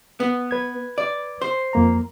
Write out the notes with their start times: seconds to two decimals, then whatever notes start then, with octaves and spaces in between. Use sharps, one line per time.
0.20 B3
0.51 B4 G#6
0.98 D5
1.42 C5
1.73 F2 A#3 A#5